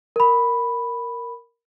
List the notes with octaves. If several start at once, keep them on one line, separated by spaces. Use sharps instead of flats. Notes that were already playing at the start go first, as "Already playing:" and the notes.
A#4 B5